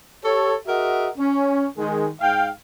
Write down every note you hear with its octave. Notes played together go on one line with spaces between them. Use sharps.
G4 A4 C#5
F#4 G#4 A#4 D#5 E5 F#5
C#4
D#3 G#3
G#2 F5 G5